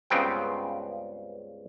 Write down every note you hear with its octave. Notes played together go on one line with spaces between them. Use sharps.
C#2 G2 C#3 B3 C4 G5